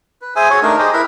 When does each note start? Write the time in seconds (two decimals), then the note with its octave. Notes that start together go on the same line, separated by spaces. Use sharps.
0.22 B4
0.36 G#4 C5 E5 G#5
0.50 F#4 G#4 C#5
0.62 A3 D4 D#4 A#4
0.79 G4 G#4 C5 D#5
0.93 E4 A#4 B4 B5